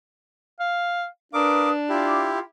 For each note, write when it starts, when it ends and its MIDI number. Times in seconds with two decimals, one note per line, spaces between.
0.60 1.06 77
1.33 2.38 62
1.33 1.69 70
1.33 1.71 71
1.33 1.71 77
1.33 1.69 86
1.33 1.71 87
1.89 2.39 64
1.89 2.37 65
1.89 2.39 67
1.89 2.37 86